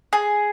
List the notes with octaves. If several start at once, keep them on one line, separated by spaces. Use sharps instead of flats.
G#4